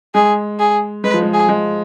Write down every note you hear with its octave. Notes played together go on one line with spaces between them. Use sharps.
G#3 G#4
G#4
G#3 B4
F3
G#3
G#4
G#3